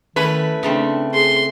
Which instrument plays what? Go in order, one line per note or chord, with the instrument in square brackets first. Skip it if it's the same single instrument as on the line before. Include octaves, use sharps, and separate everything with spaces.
[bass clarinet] D#3 [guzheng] A3 C#4 E4 [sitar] B4
[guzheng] C#3 A3 C4 [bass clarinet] D4
[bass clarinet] G#4 [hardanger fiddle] C6